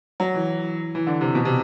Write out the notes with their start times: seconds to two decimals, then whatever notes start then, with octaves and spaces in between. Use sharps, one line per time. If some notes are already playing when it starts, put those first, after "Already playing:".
0.20 F#3
0.34 E3
0.95 E3
1.07 D3
1.21 C3
1.35 B2
1.45 C3